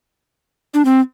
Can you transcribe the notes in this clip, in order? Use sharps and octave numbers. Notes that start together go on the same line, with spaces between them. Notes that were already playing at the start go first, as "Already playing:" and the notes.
D4
C4